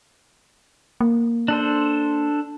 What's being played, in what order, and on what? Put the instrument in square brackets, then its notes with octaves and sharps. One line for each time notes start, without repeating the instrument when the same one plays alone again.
[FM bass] A#3
[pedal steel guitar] D4 A4 C5